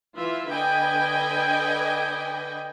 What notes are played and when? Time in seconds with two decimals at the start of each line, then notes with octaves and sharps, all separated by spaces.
0.17 E3 F4 E5
0.49 D3 B4 D#5 G5 G#5